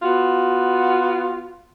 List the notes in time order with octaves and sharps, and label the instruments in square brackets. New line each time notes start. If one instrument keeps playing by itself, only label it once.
[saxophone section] B3 F4 F#4